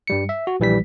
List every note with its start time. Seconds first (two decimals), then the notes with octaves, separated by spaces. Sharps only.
0.07 G2 G3 C#7
0.29 E5
0.47 F#4
0.60 A#1 E3 G3 B6